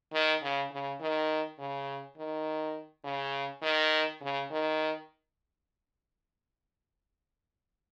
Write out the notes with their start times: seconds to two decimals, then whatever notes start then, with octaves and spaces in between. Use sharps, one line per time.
0.13 D#3
0.42 C#3
0.71 C#3
1.01 D#3
1.59 C#3
2.17 D#3
3.04 C#3
3.63 D#3
4.21 C#3
4.51 D#3